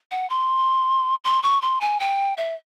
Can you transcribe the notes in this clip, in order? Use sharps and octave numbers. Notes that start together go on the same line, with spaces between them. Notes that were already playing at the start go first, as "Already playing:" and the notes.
F#5
C6
C6
C#6
C6
G#5
G5
E5